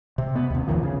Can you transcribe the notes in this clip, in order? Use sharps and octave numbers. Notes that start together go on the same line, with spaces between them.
C3
B3
D#2 C3
A1 E2 D#3 F3
C#3